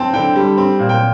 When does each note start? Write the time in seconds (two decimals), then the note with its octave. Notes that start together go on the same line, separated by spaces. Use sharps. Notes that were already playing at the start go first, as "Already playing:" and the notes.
Already playing: C4 G5 A5
0.13 D3 G5
0.36 G3
0.58 C4
0.79 A#2
0.89 G5